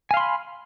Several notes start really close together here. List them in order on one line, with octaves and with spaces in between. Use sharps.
G#5 F5 C6 B5